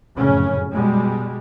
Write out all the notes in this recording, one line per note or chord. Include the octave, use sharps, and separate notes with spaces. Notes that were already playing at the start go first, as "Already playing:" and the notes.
F1 F#2 A2 C#3 C#4
B2 G3 G#3